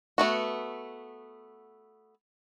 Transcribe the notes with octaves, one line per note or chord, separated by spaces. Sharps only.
A3 B3 F#4